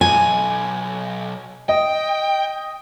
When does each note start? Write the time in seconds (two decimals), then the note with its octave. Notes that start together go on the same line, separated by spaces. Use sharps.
0.01 B1 G#5
1.69 D#5 G5